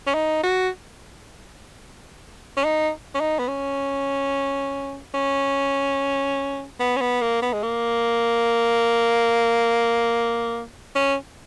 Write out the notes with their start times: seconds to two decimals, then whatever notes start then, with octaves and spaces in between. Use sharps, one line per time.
0.07 C#4
0.14 D#4
0.43 F#4
2.57 C#4
2.64 D#4
3.14 C#4
3.20 D#4
3.39 B3
3.48 C#4
5.14 C#4
6.80 B3
6.96 C#4
7.01 B3
7.21 A#3
7.42 B3
7.53 G#3
7.63 A#3
10.95 C#4